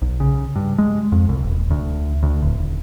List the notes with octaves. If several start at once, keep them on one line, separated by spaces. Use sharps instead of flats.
B1
C#3
G2
G#3
F2
C2
D#1
D2
D2
D1
D#1